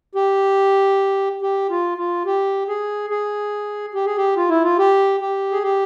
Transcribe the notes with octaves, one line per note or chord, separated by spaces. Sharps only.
G4
G4
F4
F4
G4
G#4
G#4
G4
G#4
G4
F4
E4
F4
G4
G4
G#4
G4